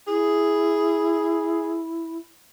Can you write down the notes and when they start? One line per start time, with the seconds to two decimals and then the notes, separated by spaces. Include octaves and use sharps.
0.07 E4 G#4